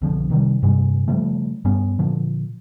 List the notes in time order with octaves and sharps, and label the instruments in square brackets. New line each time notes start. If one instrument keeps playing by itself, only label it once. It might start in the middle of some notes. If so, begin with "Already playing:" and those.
[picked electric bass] B1 D3 F3
C3 D#3 F3 G3
G2 C3 G3 G#3
C#3 F3 G3 A3
G2 G3 B3 C#4
A#2 D3 F3